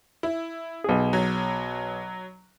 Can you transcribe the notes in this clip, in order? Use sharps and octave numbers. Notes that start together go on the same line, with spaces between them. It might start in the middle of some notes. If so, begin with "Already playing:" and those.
E4
B1 G#4
F#3